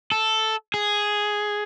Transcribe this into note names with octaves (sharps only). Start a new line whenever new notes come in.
A4
G#4